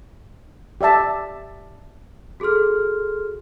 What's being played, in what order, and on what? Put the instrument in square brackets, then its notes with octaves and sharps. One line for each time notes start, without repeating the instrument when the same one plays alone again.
[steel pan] G4 D5 E5 A5
[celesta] F#4 G#4 A4 C6 F6